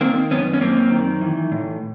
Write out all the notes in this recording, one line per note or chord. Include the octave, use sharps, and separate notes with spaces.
D#3 A#3 C4
F#2 B3 C#4
C#4
F#2 A#3 C4
D#3
E3
A2